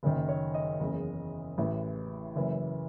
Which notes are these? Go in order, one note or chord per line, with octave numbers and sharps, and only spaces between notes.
F#1 F#2 D#3
C#5
D#5
F#1 E2 C#3
A1 A2 E3
F#1 F#2 E3